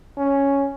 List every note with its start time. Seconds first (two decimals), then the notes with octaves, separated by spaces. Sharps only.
0.17 C#4